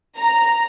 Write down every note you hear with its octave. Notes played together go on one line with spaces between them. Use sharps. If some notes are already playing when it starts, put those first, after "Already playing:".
A#5